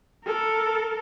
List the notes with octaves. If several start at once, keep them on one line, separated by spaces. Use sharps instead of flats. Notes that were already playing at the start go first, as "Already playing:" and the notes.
A4 A#4